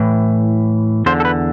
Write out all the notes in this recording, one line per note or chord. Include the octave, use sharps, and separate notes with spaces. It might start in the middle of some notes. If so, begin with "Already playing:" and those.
Already playing: A2 E3
E2 D3 C5
A4
B4